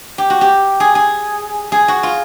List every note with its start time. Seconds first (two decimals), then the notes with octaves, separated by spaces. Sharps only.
0.18 G4
0.30 F#4
0.41 G4
0.80 G#4
0.95 G#4
1.72 G#4
1.88 F#4
2.03 F4